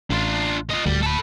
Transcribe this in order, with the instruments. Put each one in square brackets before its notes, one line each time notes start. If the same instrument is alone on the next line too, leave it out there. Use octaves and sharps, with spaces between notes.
[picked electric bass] A1 [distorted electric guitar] D4 F4
[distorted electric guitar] F4 D#5
[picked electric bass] D1 G#1 D2 [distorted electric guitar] G3
[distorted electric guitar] A4 B5